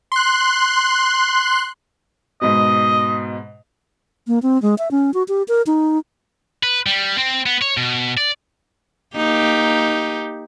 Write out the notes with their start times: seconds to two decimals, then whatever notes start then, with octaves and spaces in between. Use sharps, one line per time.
0.12 C6 F#6
2.42 G#2 B2 D#5
4.27 A#3
4.42 C4
4.62 G#3
4.78 E5
4.91 C#4
5.14 F#4
5.28 G4
5.48 A#4
5.67 D#4
6.63 B4
6.86 G3
7.18 C4
7.46 B3
7.62 C#5
7.77 B2
8.17 D5
9.16 A#3 D#4 G4